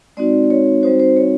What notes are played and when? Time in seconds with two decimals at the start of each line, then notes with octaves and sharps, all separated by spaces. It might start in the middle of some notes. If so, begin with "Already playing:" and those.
0.17 G#3 C4 D#4 F#4 D5
0.50 C#5
0.83 G3 C4 D#4 F#4 C5
1.00 C5
1.16 C#5